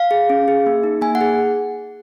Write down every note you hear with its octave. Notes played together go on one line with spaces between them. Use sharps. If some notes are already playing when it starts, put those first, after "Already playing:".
Already playing: F5
G#4
C#4
G#4
A#3
D#4
A#3 G#5
F#5
G#4